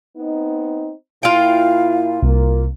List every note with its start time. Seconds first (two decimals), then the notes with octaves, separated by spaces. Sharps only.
0.16 B3 C4 D#4
1.23 A#2 E4 F4 F5 G5
2.22 C2 A#3